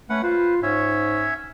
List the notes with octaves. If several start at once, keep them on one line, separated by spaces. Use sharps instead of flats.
A3 C#4 B4 F#5
F4 B4 C5
G#2 C#4 C#5 E5